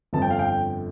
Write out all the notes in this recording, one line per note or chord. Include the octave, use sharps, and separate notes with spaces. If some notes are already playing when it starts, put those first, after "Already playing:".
G1 F2 D3 A5
G5
F5
G5